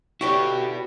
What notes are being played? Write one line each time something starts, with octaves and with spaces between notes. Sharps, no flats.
D3 C#4 D#4 E4 F#4 G4 B4 C#6